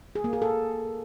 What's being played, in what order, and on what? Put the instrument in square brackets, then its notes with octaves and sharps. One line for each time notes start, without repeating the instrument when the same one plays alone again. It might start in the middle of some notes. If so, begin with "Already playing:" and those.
[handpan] G#4
A#3
G#4
A4